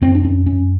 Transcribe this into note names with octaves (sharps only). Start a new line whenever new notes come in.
F#2 C4
D4
F#2 C#4
F#2 C#4